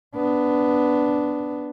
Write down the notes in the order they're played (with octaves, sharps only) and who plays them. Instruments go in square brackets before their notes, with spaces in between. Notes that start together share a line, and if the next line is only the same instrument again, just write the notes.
[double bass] B3 D4